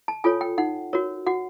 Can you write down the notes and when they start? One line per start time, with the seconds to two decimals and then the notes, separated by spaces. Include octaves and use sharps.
0.08 A5
0.24 F4 A4 C#5 G#5
0.41 G5
0.58 D#4 F#5
0.93 F#4 A#4 C#5
1.27 F#4 F#5